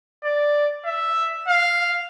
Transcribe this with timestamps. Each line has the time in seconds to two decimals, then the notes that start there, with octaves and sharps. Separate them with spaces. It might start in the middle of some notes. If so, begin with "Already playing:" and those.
0.23 D5
0.85 E5
1.48 F5